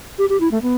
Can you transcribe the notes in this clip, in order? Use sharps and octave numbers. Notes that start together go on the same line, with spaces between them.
G4
G4
E4
A3
B3